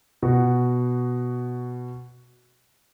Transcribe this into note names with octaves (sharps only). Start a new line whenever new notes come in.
B2 F#4